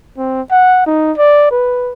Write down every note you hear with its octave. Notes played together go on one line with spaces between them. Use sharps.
C4
F#5
D#4
D5
B4